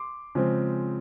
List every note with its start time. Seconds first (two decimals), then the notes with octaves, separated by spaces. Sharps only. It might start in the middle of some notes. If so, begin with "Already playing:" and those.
Already playing: C6 D6
0.35 C#3 F3 G#3 C4